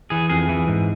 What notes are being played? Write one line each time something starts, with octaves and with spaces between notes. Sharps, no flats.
E3 G#4
F2 G#4
E3
G#2